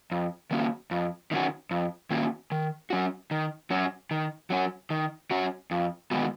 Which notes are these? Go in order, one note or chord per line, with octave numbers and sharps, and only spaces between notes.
F2
D#3 A#3 C#4 F#4
F2
D#3 A#3 C#4 F#4
F2
D#3 A#3 C#4 F#4
D#3
F#3 C#4 F#4
D#3
F#3 C#4 F#4
D#3
F#3 C#4 F#4
D#3
F#3 C#4 F#4
F2
D#3 G#3 B3 F#4